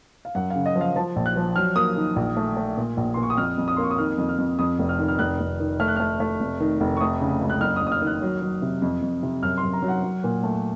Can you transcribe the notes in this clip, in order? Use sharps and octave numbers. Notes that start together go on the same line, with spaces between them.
F5
F#2 F#5
F5
C#3
D#5
F3
F5
F3 A5
A#1
F#6
F3
F#3 F6
A#3 D#6
D#3
A#1
A3
A3
A#2
A#1
C6
A#2
C#6
D#6
F2 F6
F2
D#6
A#3 C6
C#6
D#6
D#3 F6
F2
F6
F2
F2 D#6
F1
F6
D#3
F6
F1 F#6
F1
D#3
A3 F6
F#6
A3 F6
A3
F1
D#3
F1
C#6
A3 D#6
C#3
C#2
F#6
F#1 F6
D#6
F#1
D#6
F6
D#3
F#6
F#3
F#3
C3
F2
F2
C3
F#2 F6
C6
F#2
A#5
F#3
F#5
F#3
A#2
A3